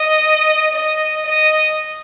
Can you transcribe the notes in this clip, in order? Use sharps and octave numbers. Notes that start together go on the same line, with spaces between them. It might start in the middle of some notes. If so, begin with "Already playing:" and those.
Already playing: D#5
D#5
D#5